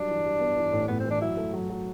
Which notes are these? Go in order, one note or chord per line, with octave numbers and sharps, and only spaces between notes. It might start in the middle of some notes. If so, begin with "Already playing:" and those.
Already playing: F#3 G3 D4
E3
G3
B3
E3
A2
A2 B3
C4
E3
D4
F#3 E4
A3
F#3
F#3